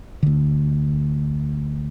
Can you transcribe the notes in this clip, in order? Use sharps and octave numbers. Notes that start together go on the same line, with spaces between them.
D2 D3